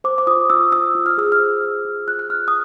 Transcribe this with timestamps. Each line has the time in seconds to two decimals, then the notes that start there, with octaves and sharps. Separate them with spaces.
0.04 C5 D6
0.18 D6
0.27 F4 D#6
0.50 F4 E6
0.72 F4 E6
0.95 F4
1.06 F6
1.18 G#4 E6
1.32 F6
1.39 C5
1.62 G#4
1.85 F4
2.08 F4 F#6
2.19 F#6
2.30 F4 F6
2.48 D#6